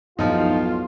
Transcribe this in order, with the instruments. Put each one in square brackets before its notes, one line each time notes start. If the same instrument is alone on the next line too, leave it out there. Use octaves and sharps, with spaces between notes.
[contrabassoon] B1 [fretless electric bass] F#2 A2 [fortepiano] F3 D#4 [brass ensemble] F4